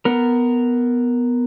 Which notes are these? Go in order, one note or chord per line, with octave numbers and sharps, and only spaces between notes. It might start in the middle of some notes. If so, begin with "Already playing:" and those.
B3 A#4